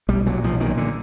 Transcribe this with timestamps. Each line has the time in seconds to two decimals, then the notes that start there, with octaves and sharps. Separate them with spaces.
0.08 B1 G3
0.26 A#2 F#3
0.44 B1 F3
0.60 A#2 D#3
0.77 D3